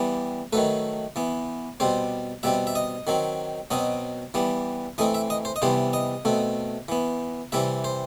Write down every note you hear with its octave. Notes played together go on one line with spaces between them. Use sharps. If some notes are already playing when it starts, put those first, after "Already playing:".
Already playing: E3 G3 B3
D#3 F#3 A3 B4
E3 B3
B2 G3 C4 C5
B2 G3 C4 E5
E5
D#5
D#3 F#3 C4
B2 F#3 C4 D#5
E3 G3 B3
E3 A3 C4 D#5
E5
D#5
C5
D#5
C3 E3 G3 B3 C5
D#5
B2 A3 C4
E3 B3
C3 E3 G3 C4 E5
C5